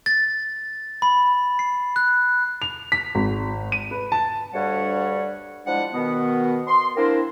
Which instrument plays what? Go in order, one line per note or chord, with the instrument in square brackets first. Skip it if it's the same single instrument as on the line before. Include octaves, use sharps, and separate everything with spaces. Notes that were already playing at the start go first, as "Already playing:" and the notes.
[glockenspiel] A6
B5
C7
F#6
[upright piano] F7
B6
G#1
D#7
B4
A5
[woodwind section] D2 G2 G3 C#5 F#5
F3 G3 G#3 D4 E4 F#5
B2 D#3 B3
C6
A#3 C4 D4 E4 A#4